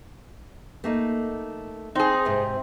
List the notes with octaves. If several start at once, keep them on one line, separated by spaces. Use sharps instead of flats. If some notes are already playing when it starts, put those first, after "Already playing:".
A3 A#3 D#4
C4 D#4 G#4
G#2 C3